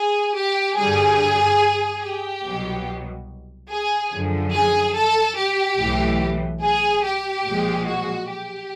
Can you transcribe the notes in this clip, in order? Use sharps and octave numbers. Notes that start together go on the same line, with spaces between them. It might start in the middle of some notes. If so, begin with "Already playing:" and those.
Already playing: G#4
G4
G2 D3 G3 G#4
G4
C2 B2 F#3
G#4
F#2 D3 F3
G#4
A4
G4
B1 A2 E3
G#4
G4
B1 A#2 F3 G#3
F#4
G4